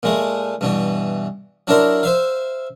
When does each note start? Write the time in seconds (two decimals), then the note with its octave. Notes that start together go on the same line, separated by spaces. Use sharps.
0.03 A#2 G#3 A3
0.61 G2 B2 E3
1.67 F#3 D4 E4 A#4 A#5 C6
2.03 C5 E5 F5